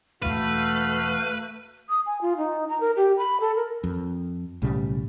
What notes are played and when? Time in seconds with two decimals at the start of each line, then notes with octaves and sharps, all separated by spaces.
0.22 E1 E2 A3 F#4 B4 F5
1.89 D#6
2.06 G#5
2.22 F4
2.37 D#4
2.69 A#5
2.80 A#4
2.97 G4
3.18 B5
3.41 A4
3.56 A#4
3.84 F2
4.62 B1 A2 C#3 G3